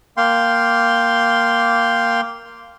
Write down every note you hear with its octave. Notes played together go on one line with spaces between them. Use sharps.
A#3 F5 G5 C6